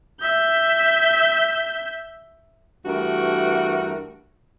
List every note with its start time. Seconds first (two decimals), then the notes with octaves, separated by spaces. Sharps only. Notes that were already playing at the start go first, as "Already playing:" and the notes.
0.21 E5 G6
2.85 G2 E3 A3 F#4 A#4